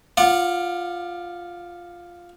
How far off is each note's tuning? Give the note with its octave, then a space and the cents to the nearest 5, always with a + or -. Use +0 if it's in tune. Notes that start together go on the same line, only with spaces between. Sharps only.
F4 +0 F#5 -20 D6 +25